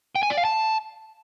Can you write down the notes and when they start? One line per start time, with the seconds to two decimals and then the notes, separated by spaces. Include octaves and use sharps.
0.16 G5
0.23 G#5
0.30 D5
0.37 F5
0.45 A5